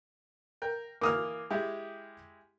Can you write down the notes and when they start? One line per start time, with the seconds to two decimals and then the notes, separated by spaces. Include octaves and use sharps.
0.62 A#4 G5
1.01 E3 A#3 D6 D#6 F6
1.50 G#3 E4 G4